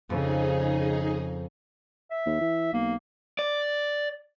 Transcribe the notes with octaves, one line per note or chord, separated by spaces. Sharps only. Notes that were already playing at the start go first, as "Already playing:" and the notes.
F2 C#3 D#4 G#4
E5
D#2
E3
B1 A#3
D5